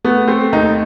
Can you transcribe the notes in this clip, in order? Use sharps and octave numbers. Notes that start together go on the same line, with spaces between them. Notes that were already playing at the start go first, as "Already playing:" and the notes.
A3 B3
A3 C4
D#2 D#4